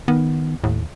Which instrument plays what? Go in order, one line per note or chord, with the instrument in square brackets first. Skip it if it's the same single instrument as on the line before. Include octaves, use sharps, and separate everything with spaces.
[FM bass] D#3 [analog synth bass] B3
[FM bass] D#2 [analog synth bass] A2